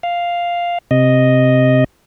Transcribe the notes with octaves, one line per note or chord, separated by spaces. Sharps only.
F5
C3 D#5